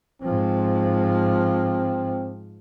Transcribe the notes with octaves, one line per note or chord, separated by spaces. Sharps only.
G#2 F3 C4